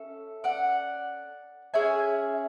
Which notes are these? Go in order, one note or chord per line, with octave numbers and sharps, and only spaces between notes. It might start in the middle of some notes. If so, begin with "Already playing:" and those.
Already playing: C#4 A4 E5
D5 F#5
C#4 G#4 E5 G#5